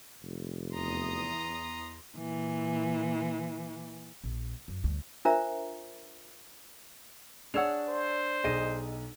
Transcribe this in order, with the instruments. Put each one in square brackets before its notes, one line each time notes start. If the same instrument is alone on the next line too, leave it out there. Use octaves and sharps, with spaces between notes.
[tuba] F1
[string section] E2 D#6 [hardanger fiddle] A#5 C6
[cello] A#2 E3
[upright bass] A#1
F#2
D2 G3
[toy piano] D4 F4 A#4 C5 E5 A#5
[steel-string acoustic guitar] D4 [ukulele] G#4 C#5 F#5 [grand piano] E6 E7 F7
[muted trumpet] C5
[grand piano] B1 D#7 [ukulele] G#4 D#5